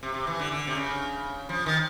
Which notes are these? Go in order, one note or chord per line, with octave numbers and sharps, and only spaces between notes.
C3
C3
E3
D3
D3
C3
C#3
F3
D#3